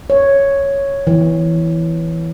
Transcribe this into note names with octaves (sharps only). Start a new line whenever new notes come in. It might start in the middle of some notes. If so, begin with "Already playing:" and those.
C#5
E3